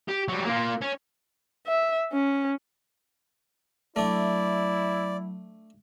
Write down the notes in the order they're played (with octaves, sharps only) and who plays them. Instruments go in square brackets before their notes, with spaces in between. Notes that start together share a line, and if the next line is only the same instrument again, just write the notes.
[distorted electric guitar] G4
F#3 G3
A#3 F4
C#4
[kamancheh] E5
C#4
[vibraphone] F#3 [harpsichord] A3 D4 [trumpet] E4 [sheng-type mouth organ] D5